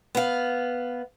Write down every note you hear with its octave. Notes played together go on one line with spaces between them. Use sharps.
B3 F5